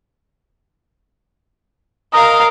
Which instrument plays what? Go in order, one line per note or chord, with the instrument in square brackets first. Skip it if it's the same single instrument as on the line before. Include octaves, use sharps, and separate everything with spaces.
[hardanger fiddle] A#4 F5 [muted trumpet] D#5